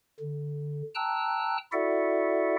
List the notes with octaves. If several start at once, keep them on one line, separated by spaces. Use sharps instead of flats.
D3
G5 A5 A#5 E6 F#6
E4 F#4 A4 D5 E5 F#5